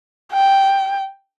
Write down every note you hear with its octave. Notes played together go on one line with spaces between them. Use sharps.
G5